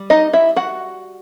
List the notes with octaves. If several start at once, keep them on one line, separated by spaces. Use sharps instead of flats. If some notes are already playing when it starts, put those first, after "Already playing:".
Already playing: G3
D#4 D#5
E4 E5
F#4 F#5